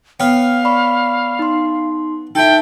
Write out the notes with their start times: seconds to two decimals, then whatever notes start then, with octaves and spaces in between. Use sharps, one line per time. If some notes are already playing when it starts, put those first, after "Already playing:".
0.20 B3 C#5 F5 G5 F6
0.64 D5 B5 C#6
1.39 D#4 C6
2.35 D#4 E4 A4 G5 A5